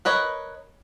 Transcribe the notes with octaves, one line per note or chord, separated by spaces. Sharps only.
A#4 B4 C#5 D#5